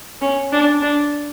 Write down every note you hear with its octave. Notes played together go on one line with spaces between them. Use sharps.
C#4
D4
D4